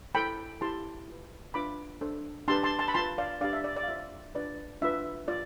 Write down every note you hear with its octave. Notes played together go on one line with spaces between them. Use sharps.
E4 A4 C5 G5 B5
E4 G4 C5 A5 C6
F4 B4
D4 F4 B4 B5 D6
D4 A4 C5
D4 G4 B4 A5 C6
A5 C6
A5 C6
B5
F4 B4 A5 C6
D5 F5
D4 G4 B4 D5 F5
E5
D5
D5
F5
F4 C5 E5
D4 F4 B4 D5
D4 F4 B4 E5
F4 D5